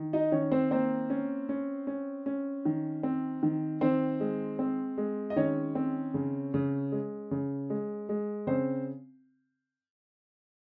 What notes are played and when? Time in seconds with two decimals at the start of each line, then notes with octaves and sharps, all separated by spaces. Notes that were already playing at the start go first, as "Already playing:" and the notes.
Already playing: D#3
0.13 D#4 D#5
0.32 D#3 C#4 C#5
0.51 C4 C5
0.71 A#3 C4 C5
1.10 C#4
1.49 C#4
1.87 C#4
2.26 C#4
2.65 D#3
3.03 C4
3.43 D#3
3.81 D#3 C4 C5
4.20 G#3
4.59 C4
4.98 G#3
5.30 D#5
5.36 D#3 C#4 C#5
5.75 C4
6.14 C#3
6.54 C#3
6.92 G#3
7.31 C#3
7.70 G#3
8.09 G#3
8.47 C#3 C4 C5